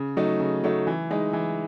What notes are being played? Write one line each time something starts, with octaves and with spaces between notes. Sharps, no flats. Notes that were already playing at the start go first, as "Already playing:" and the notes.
Already playing: C#3
F#3 A3 D#4
C#3
F#3 A3 D#4
E3
G#3 D#4
E3